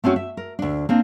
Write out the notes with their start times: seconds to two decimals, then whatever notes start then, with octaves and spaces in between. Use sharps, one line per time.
0.04 A3 C4 C#4 F#4
0.16 E5
0.37 A#4
0.59 D2 D4
0.89 A#3 C4 D4